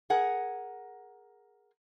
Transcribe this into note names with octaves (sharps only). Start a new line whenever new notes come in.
G#4 A#4 F#5